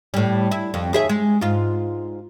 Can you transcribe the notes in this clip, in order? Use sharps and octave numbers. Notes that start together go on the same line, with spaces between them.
A2 G3
E4
F2
D#2 G#4 E5
G#3
G#2 F4